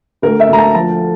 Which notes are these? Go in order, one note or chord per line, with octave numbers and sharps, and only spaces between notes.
D2 A#4
E5
D2 A#5
A5
F3 A5